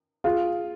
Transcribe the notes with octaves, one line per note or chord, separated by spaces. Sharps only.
F4 G#4